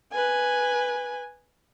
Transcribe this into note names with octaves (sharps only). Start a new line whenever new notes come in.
B4 G#5